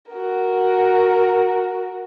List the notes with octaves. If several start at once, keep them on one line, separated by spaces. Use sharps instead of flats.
F#4 A#4